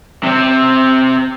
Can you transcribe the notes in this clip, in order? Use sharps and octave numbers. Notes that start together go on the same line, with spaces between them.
C3 C4